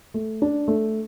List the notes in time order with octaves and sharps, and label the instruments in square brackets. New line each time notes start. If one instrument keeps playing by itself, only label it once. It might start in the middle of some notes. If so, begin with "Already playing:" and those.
[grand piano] A3
D4
A3